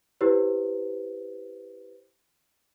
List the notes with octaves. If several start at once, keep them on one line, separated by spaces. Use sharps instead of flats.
E4 G4 B4 C5